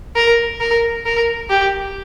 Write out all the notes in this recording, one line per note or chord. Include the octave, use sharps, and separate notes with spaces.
A#4
A#4
A#4
G4